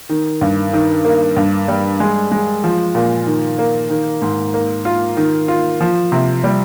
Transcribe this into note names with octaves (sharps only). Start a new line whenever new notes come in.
D#3
G2
D#3
A#3
G2
G3
G#3
G#3
F3
A#2
D#3
A#3
D#3
G#2
A#3
F4
D#3
F4
F3
C3
G3